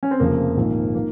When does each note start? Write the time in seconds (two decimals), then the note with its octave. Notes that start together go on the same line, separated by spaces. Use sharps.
0.03 C#4
0.11 C4
0.20 F1 F2 C#3 F3 A#3
0.57 A#1 G#2 D#3
0.95 D#3 A#3